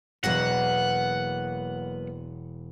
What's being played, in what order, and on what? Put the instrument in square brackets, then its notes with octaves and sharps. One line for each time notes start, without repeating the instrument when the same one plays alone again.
[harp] E1 A#6 [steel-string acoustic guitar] F#3 A#3 B3 [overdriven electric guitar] F#5